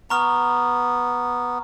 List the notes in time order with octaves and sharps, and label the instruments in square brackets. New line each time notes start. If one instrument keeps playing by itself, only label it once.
[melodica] B3 [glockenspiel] A#5 C#6 F6